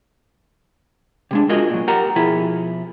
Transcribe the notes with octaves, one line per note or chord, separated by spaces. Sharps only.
C3 G#3 D4
F4 F#4 G#4 A#4 D#5
A#2 F#3
G4 A#4 F#5 A#5
B2 F3 E4 G#4